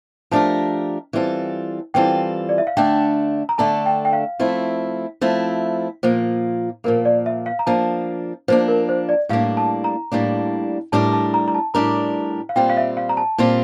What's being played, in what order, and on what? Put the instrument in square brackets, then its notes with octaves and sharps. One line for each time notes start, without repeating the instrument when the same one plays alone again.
[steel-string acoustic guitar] F3 A3 D4 G4 A#4 [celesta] A5
[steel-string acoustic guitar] E3 G3 C4 F4 A4
[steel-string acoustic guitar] E3 G3 C4 F4 A4 [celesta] G5
[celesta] D5
E5
F5
[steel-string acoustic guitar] D3 A3 D4 A4 [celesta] G5
[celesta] A#5
[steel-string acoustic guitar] D3 A3 D4 A4 [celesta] A5
[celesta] G5
G5
F5
[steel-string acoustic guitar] F3 A3 C4 E4
F3 A3 C4 E4
[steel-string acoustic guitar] A#2 F3 A#3 [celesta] C5
[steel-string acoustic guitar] A#2 F3 A#3 [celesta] A#4
[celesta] D5
E5
F5
A#5
[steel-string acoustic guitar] F3 A#3 D4 [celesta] A5
[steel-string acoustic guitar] F3 A#3 D4 [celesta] C5
[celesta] A#4
C5
D5
[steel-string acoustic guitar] A2 G3 A#3 D4 [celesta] F5
[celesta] A5
A#5
[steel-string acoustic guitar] A2 G3 A#3 D4
[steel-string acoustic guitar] A2 G3 D4 G4 A#4 [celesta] A5
[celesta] A5
A#5
A#5
A5
[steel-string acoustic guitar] A2 G3 D4 G4 A#4 [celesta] A#5
[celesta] F5
[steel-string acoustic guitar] A#2 G3 C4 F4 [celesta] G5
[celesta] F5
E5
F5
A#5
A5
[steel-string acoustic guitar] A#2 G3 C4 F4